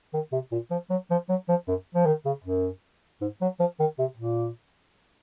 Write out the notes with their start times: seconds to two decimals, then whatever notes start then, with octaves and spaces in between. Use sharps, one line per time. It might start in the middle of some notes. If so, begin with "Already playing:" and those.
0.14 D#3
0.32 C3
0.52 A#2
0.71 F3
0.90 F#3
1.10 F3
1.29 F#3
1.49 F3
1.68 F#2
1.95 F3
2.06 D#3
2.25 C#3
2.44 F#2
3.21 G#2
3.41 F#3
3.60 F3
3.80 D#3
3.99 C3
4.17 A#2